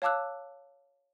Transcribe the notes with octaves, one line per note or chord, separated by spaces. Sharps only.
C#5 F5 A5 D6 E6 F#6